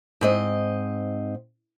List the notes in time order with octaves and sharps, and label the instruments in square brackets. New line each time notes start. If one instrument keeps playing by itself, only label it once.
[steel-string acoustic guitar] G#2 C4 D#5